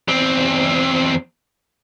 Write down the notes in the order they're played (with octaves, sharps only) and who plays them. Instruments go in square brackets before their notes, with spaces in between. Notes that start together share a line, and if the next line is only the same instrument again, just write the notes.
[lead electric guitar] E2 C4